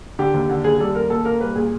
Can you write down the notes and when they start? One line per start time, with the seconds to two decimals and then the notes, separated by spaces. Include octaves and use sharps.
0.19 D3 G4
0.34 D#2
0.49 D3
0.64 D#2 G#4
0.80 G3 A4
0.95 D#2 A#4
1.10 A#2 A4
1.25 A#3 A#4
1.41 G3 B4
1.56 A#2 G#4